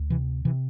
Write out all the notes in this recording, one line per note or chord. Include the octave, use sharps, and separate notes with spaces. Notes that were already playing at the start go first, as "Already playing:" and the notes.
Already playing: D2
C3 E3
C3 E3